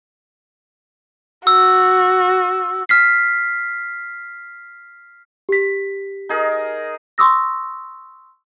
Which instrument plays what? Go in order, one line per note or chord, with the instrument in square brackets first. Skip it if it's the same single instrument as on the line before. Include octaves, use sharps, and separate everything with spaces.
[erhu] F#4 [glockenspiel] E6
[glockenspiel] F6 B6 C7
[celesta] G4 B6
[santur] D#4 G#4 A#4
[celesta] C6 C#6 D#6 E6 A#6